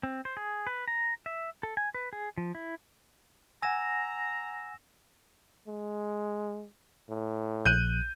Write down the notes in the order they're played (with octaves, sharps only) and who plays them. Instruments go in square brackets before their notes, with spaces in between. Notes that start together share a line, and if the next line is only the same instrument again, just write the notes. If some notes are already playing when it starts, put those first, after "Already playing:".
[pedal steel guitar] C4
C5
G#4
B4
A#5
E5
A4
G#5
B4
G#4
F3
E4
[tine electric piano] F#5 G#5 [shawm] A#5 [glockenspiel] E6 A#6 E7
[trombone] G#3
A2
[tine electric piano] A#1 F#6 [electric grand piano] G6 D#7